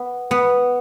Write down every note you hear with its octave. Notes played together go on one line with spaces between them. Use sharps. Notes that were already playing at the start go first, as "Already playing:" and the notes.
Already playing: B3
B3